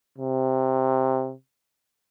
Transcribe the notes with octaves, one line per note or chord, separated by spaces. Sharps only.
C3